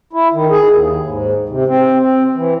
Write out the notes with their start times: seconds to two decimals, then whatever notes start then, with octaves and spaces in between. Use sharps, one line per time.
0.13 E4
0.34 D#3
0.51 G#4
0.71 D#2
1.06 G#2
1.49 C3
1.68 C4
2.00 C4
2.35 E3